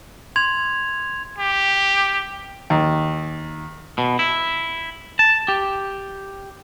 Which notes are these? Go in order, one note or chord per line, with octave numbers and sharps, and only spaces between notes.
C6 G#6 F7
G4
D#2
B2
E4
A5
G4